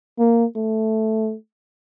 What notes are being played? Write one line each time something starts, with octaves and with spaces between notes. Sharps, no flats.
A#3
A3